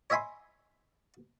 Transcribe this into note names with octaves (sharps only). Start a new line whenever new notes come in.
C#5 D#5 E5 G#5 B5 C6